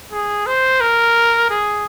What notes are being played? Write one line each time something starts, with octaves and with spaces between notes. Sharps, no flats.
G#4
C5
A#4
G#4